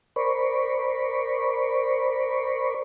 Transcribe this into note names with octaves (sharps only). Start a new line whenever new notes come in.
A#4 C5 D5 B5 C#6